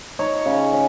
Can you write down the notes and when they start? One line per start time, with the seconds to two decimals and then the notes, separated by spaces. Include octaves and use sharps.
0.19 D#4 C#5
0.46 C#3
0.73 C#4